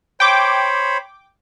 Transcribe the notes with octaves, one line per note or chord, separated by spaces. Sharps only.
C5 C#5 G5 B5 D6